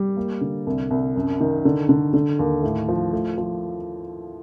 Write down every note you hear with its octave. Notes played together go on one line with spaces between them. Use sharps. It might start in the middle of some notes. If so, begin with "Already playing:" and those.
Already playing: G3
A#3
D3
C2
C2
F#2
D#3
D3
D3
D3
D#2
A2
F3
A3
F3